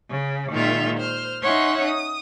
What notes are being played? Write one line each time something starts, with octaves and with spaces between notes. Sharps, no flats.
C#3
A#2 D#3 G#3 F4 E5
C5 F6
C#4 D#4 C#5 E5 F#5 C6
D#6